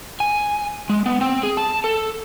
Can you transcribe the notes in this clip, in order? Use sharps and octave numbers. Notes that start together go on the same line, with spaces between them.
G#5
G#3
B3
C4
G#4
A5
A4